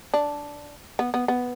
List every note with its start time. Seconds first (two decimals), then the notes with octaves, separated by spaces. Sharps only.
0.14 D4
0.99 B3
1.14 B3
1.28 B3